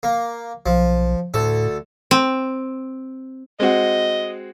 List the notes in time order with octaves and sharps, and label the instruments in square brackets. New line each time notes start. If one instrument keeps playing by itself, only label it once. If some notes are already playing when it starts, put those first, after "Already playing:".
[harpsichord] A#3
[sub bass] B1 [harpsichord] F3
[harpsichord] D2 A4 [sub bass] A2
[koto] C4
[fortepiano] G#3 C4 F#4 [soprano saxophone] D#5